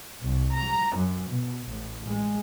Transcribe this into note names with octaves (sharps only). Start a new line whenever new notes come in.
C2
A#5
F#2
B2
A1
G#3